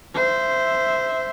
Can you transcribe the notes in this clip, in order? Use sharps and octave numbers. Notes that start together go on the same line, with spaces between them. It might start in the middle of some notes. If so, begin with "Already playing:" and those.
C5 E5